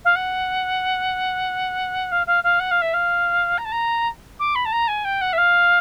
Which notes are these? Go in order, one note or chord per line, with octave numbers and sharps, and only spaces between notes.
F5
F#5
F5
F5
F5
F#5
F5
E5
F5
A#5
A5
A#5
D6
B5
A5
A#5
G#5
G5
F#5
E5
F5